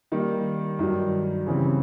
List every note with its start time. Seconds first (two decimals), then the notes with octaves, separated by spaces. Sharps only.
0.12 D#3 G3 A#3
0.79 G2 D#3 F#3
1.46 C#3 E3 G3 C4